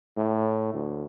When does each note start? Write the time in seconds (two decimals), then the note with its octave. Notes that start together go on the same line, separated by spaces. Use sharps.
0.17 A2
0.74 D2